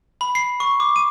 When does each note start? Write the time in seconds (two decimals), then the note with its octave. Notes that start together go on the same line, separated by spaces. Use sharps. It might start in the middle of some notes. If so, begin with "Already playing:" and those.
0.21 B5
0.35 C7
0.60 C#6
0.80 D6
0.96 D#7